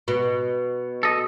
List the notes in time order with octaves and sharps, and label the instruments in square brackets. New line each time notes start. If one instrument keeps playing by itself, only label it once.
[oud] B2
[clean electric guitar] A4 D#5